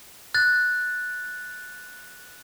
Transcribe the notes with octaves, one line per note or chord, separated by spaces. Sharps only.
F#6 A6